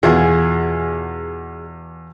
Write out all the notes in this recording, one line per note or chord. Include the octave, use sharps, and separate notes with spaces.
E2 B2 F4 G#4 F#5 G#5